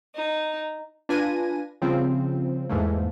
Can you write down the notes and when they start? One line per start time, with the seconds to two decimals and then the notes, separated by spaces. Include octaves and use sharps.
0.15 D#4
1.09 D4 F4 B4 G#5 A#6 D#7
1.82 C#3 F3 G3 C4
2.69 E2 G#2 E3 A3 A#3